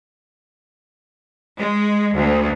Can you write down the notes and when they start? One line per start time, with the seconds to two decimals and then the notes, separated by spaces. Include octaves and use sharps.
1.59 G#3
2.16 D2